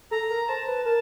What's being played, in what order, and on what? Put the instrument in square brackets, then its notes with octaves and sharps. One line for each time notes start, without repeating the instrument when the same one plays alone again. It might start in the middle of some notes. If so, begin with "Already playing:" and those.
[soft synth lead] A4 [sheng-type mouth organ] A#5
[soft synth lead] A#4
[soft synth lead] C5 [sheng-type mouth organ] A5
[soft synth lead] B4
[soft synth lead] A#4 [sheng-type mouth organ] A5